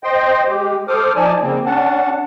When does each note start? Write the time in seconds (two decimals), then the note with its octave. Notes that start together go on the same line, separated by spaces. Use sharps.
0.04 C5 D#5 G5 C6
0.46 G#3 G4
0.88 A4 C5 D6 D#6 F6
1.15 F3 D#4 D5 G#5 A5
1.42 C#3 A#3 C4
1.66 C#4 D4 F#5 A5